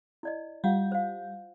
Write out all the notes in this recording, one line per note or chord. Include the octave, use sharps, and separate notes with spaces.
E4 D5 D#5
G3 F4 F5 F#5
C5 F5